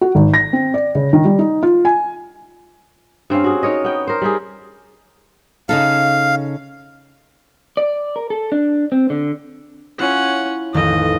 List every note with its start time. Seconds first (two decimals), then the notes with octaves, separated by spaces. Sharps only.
0.01 F#4
0.15 G#1
0.34 A#6
0.53 C4
0.74 D5
0.95 C#3
1.13 D#3
1.25 G3
1.39 D#4
1.63 F4
1.85 G#5
3.30 G2 C4 C#4 F5
3.44 F#4 G#4
3.63 D#4 A#4 C#5 D#5
3.84 B3 G5
4.07 A#4 C5
4.22 G3 D#4 G4 G#4
5.69 C#3 D#4 A4 F5
7.77 D5
8.16 A#4
8.30 A4
8.52 D4
8.92 C4
9.10 D3
9.99 C#4 E4 F4 C#5 F#5
10.74 A1 F2 D#3 D#5